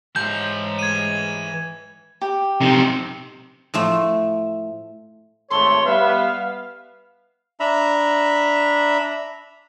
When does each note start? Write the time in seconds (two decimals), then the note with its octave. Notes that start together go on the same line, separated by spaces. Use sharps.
0.16 G#2 E3 G#3 A5 G6
0.79 G#6 D#7
2.21 G4
2.61 C3 D#4
3.74 A2 F3 A3
5.51 G#1 A3 A4 C#5 C6
5.86 G3 B3 B4 E5 F5
7.60 D4 E5 A#5 B5